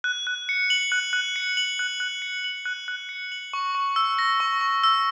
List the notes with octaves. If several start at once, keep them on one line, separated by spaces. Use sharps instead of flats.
F#6
F#6
C#7
F#7
F#6
F#6
C#7
F#7
F#6
F#6
C#7
F#7
F#6
F#6
C#7
F#7
C#6
C#6
E6
A#6
C#6
C#6
E6